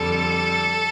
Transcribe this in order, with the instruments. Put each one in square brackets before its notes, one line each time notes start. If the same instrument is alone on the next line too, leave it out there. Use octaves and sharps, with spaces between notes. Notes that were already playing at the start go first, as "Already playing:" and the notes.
Already playing: [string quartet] F2 D3 G3 A4